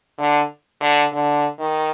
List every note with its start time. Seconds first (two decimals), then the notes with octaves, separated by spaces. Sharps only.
0.18 D3
0.80 D3
1.12 D3
1.59 D#3